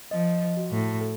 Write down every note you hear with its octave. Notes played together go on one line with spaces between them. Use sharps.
F3 D#5
F#4
A2
A4